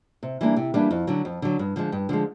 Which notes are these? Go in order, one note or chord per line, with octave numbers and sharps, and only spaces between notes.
C3
E3 G3 A#3 D4
C3
E3 G3 A#3 D4
F2
D3 F#3
F2
D3 F#3
G2
D3 F3 G#3
G2
D3 F3 G#3